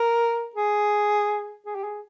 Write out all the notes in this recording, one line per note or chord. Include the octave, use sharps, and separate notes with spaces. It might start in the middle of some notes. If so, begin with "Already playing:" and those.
Already playing: A#4
G#4
G#4
G4
G#4